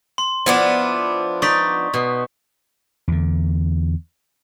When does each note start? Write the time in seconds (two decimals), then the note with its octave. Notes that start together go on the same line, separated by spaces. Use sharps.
0.18 C6
0.46 F3 B3 D4 E4
1.42 D#4 D5 C#6 B6
1.94 B2
3.08 E2 D3